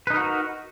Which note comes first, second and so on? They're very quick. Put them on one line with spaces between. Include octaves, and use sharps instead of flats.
B4 D#4 A#4 F#4